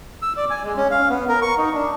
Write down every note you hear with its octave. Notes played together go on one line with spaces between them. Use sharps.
E6
D5
G#5
G#3
C#4
F5
B3
A#4
C#6
D#4
D4